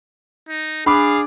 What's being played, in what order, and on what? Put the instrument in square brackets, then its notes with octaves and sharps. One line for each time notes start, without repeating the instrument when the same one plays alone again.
[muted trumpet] D#4
[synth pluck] D4 F#6 A6 [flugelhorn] G#4 [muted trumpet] F5 [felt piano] B5 D6